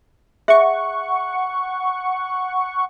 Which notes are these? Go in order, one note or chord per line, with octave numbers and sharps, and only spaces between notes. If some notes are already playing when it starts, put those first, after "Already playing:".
G#4 E5 F#5 C#6